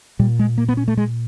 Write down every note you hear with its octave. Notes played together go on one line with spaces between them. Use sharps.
A#2 G3
G#3
A#3
B3
C#4
A3
G#3